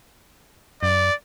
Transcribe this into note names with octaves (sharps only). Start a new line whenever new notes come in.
F#2 D5